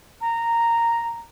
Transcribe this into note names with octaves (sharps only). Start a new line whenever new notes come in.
A#5